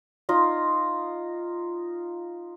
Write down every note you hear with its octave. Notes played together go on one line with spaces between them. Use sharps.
D#4 F4 D#5